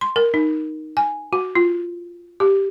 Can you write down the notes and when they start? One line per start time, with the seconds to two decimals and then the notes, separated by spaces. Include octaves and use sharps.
0.01 C6
0.16 A#4
0.34 D#4
0.97 G#5
1.33 F#4
1.55 F4
2.40 G4